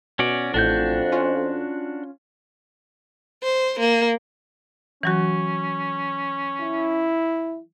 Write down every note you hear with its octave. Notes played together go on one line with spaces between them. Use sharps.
B2 C#4 F#4 D5
A1 F2 A2 D4 F#4 G6
C#4 F4
C5
A#3
E3 F#3 C#4 F#4
E4